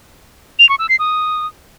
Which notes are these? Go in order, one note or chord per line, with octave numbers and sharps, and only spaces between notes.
F7
C#6
E6
C7
D#6